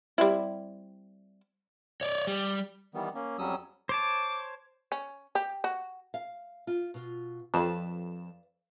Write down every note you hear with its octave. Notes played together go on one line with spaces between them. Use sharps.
G3 C4 E4
C#5 D5
G3
D#3 E3 G3 B3
A#3 C#4
F2 F#3 G3 C#4 D#6 E6
C5 C#5 A5 D6
C#4
G4
F#4
F5
F4
B2 F4
F2 B4 D5 F5 E7